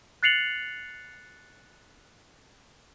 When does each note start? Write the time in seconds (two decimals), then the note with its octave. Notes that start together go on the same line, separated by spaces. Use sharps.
0.23 F#6 A6 C7 C#7 F7 F#7